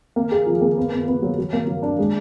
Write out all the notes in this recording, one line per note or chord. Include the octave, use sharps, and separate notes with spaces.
A#3
G#4
F3
A#3
B3
B3
B3
F#3
F#3
A#3
F#3
D4
G#3